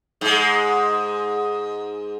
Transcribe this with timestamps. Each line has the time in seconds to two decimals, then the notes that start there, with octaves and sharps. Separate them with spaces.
0.21 G#2 G#3